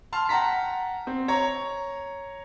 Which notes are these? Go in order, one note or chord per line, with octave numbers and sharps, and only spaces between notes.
A5 C6 F6
F#5 G5 A5 A#5 B6
C4
C#5 A#5